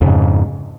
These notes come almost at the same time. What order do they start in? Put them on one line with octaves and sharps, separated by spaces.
F2 C#3 G#2